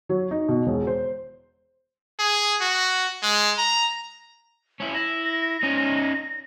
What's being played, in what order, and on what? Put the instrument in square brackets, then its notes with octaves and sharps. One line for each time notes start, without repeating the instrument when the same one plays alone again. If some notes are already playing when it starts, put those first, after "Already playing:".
[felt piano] F#3
D#4
B2
E1
C5
[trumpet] G#4
F#4
G#3
A#5
[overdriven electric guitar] C#4 E4
[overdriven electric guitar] E4 [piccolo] A#6
[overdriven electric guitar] C#4 D#4